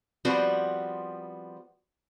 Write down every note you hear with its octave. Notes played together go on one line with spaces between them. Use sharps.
F3 G3 B3 C4 F#4